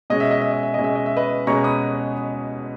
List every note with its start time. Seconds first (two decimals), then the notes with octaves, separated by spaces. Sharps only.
0.10 B2 G#3 C#4 D#5
0.20 E5
0.31 D#5
0.42 E5
0.53 D#5
0.63 E5
0.74 B2 G#3 C#4 D#5
0.84 E5
0.95 D#5
1.06 E5
1.16 B4 D#5
1.47 B2 G#3 C#4 A#5 C#6
1.64 B5 D#6